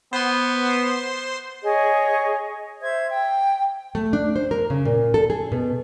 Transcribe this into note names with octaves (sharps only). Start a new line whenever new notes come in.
B3 C5 C6
G#4 C#5 D#5
C5 E5 G#6
G5
A3
D4
C5
A#4
C#3
A#2
A4
G#4
B2